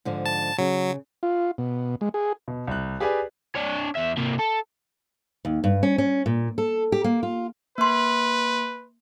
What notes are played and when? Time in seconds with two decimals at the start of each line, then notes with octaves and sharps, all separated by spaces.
0.05 G#2 D3 F3
0.26 A5
0.58 C#3 F#3
1.23 F4
1.58 B2
2.01 G#3
2.14 G#4
2.48 B2
2.67 C2 F#6
3.00 G4 G#4 B4 D5 G#5
3.55 D4 C#5
3.96 E2 E5
4.17 C3 A#3
4.39 A4
5.45 D#2
5.64 G2
5.83 C#4
5.98 C#4
6.26 A#2
6.58 A4
6.92 G4
7.04 A#3
7.23 F4
7.78 A#3 B4 C6